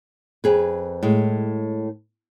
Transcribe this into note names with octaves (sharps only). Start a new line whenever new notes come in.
F2 G#4 B4
A2 G#3